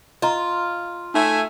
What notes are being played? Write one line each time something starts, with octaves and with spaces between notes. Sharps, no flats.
F4 D#5 A#5
A3 D#4 E5 G#5